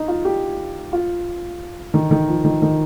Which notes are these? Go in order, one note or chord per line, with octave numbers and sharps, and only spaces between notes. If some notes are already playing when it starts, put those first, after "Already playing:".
Already playing: D#4
F4
G4
F4
D#3
D#3
F3
D#3
D#3